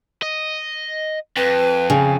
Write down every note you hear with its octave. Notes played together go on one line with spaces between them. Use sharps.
D#5
F2 B4
C#3